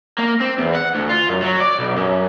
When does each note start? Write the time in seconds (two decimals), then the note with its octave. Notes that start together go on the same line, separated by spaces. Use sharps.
0.18 A#3
0.40 C4
0.58 E2
0.75 F#5
0.95 D2
1.09 F4
1.29 F#2
1.42 F#3
1.60 D5
1.79 B1
1.96 F#2